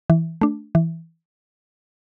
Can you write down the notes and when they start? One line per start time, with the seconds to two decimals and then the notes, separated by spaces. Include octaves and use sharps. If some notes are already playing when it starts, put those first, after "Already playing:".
0.10 E3
0.41 A3 D4
0.75 E3